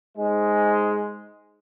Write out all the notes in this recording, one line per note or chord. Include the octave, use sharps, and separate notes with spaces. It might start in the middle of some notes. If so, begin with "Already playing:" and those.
G#2 G#3